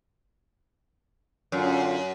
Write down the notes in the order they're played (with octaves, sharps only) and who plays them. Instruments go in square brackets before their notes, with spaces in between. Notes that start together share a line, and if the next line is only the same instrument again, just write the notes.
[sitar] F#2 [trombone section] D3 C#4 F4